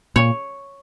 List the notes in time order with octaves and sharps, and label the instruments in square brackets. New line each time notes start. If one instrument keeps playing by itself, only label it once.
[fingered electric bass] A#2 [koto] C#5